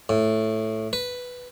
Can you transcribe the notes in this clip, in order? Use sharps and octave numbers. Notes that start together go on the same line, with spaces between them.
A2
B4